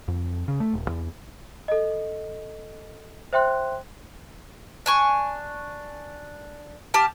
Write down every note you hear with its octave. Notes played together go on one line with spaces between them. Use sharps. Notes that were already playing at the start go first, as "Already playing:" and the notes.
F2
C#3
A3
D#1
E2
A4 D#5
C5 E5 G5 C6 F#6
D4 G#5 C#6
G4 A5 F6